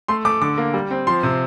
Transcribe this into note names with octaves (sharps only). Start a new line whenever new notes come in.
A3 C6
A3 D6
D3 D6
A#3
G3
C4
F3 C6
C3